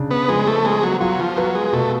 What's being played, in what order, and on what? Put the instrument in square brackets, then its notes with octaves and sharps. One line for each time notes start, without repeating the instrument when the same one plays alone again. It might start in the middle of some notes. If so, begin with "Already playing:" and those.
Already playing: [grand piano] C#3 D4
[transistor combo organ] B3
[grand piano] F3 [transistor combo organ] G#3
[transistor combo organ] A3
[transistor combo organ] G#3 [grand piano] B3
[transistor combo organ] F#3
[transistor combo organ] F#3 [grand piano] F4
[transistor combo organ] F3
[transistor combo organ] F#3 [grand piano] B4
[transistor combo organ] G#3
[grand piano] B2 [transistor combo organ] A3